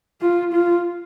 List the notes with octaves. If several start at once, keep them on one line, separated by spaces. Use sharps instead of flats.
F4
F4